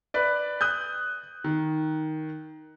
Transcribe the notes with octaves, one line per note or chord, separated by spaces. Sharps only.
B4 D5
D#6 F#6 G6
D#3